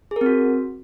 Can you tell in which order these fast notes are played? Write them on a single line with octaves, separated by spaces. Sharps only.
G#4 A#4 C4 F#4